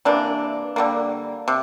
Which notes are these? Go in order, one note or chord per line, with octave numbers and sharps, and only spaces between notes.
C3 E3 A#3 D4
D3 G3 A#3
C3